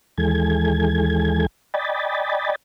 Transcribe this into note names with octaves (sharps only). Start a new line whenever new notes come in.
D#2 E3 G#3 A4 G#5 G#6
D5 D#5 G5 G#5 B5 A6